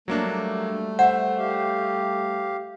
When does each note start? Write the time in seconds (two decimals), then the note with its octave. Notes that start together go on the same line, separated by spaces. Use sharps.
0.08 F#3 G3 A3 A#3 D4
0.99 C5 E5 F#5
1.37 G4 F5